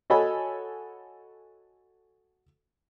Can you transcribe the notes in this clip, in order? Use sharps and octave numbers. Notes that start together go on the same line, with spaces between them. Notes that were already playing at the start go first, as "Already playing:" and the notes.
F#4 A4 C#5 D#5 G#5 B5